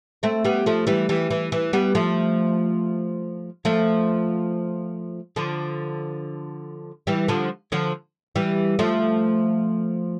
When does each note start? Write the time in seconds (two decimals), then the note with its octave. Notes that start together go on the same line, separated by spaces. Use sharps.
0.23 A3 C4
0.45 G3 B3
0.66 F3 A3
0.87 E3 G3
1.09 E3 G3
1.30 E3
1.52 E3
1.73 G3 B3
1.95 F3 A3
3.65 F3 A3
5.36 D3 F3
7.07 E3 G3
7.28 D3 F3
7.72 D3 F3
8.35 E3 G3
8.79 F3 A3